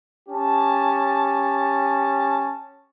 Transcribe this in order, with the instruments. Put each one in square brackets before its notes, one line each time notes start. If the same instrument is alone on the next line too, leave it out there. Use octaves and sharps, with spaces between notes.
[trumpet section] C#4 G4 A5